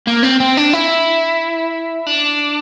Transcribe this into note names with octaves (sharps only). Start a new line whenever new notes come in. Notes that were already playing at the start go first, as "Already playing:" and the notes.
A#3
C4
C4
D4
E4
D4